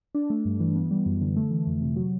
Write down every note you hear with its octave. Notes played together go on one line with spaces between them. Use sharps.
D4
A3
G2
E3
B3
G3
F#2
D3
A3
E3
F2
C3
F#3